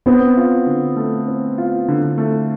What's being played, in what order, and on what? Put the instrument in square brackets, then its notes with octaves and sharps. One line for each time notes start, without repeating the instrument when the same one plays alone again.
[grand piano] B3 [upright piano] C4
[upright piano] F4
D3
A3
C4
F4
D3
A3